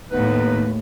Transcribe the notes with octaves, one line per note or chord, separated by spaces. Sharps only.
D#2 A2 B3 D#4 B4